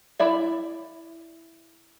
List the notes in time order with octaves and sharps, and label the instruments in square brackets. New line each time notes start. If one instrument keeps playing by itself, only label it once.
[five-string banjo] E4 D5 E5